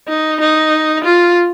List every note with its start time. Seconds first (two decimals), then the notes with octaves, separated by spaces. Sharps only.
0.08 D#4
0.41 D#4
1.05 F4